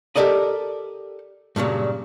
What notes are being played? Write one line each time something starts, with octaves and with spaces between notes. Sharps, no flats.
G4 A4 A#4 D5 D#5
G2 A#2 C#3 F#3